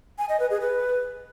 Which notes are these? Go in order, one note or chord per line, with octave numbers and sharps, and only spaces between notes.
G#5
D#5
B4
G#4
B4